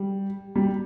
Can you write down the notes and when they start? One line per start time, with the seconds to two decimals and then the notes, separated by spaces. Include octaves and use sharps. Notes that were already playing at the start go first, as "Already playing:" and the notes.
Already playing: G3
0.56 G3